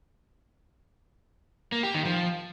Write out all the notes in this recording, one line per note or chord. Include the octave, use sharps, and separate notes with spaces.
A#3
G4
D#3
F3